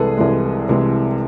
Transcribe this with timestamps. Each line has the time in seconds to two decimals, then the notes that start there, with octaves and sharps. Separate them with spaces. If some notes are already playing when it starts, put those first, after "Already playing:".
Already playing: C2 C3 E3 G#3 G#4 A4 B4
0.17 C2 C3 E3 G#3
0.69 C2 C3 E3 G#3